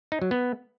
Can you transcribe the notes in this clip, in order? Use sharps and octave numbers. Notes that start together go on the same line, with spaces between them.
D#4
F#3
B3